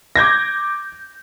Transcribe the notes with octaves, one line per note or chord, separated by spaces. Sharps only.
D6 G6 G#6 A#6